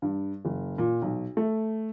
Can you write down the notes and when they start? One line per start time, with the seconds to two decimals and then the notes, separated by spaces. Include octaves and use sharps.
0.02 G2
0.45 F#1
0.78 A#2
1.02 B1
1.37 A3